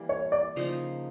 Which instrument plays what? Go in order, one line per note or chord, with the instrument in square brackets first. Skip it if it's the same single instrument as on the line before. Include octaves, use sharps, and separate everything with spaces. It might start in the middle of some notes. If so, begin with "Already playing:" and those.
Already playing: [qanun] E3 G3 A#3
[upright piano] C#5
D5
[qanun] C#3 F3 A#3 D#4